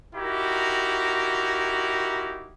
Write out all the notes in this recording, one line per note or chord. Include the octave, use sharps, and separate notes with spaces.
D#4 E4 F#4 G4 A#4